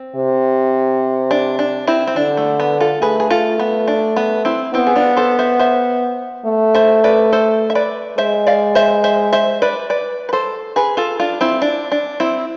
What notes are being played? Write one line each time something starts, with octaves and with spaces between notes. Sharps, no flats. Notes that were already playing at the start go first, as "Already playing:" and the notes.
Already playing: C4
C3
D4
D4
C4 E4
C4
D3 D4
A3
B3
F4 A4
A3 G#4 B4
G#4
F4 A4
B3
D4
B3
C4 E4
B3 C4 E4
G#4
D4 F4
A4 C5
C5 E5
C5 E5
A3
C5 E5
B4 D5
A4 C5
E5
B4 D5
G#3 C5 E5
D5 F5
C5 E5
C5 E5
C5 E5
B4 D5
B4 D5
B4
A4 C5
G#4 B4
F4 A4
D4 F4
C4 E4
D4
D4
C4 E4